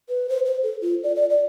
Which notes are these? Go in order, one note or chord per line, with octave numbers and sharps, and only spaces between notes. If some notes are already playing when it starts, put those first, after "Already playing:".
B4
C5
C5
A4
F4
D5
D5
D5